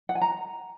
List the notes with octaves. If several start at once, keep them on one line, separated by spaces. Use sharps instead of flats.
F#5
G#5
A#5